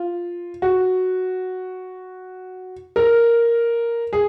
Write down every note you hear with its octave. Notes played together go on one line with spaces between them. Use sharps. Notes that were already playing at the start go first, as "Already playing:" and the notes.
Already playing: F4
F#4
A#4
G#4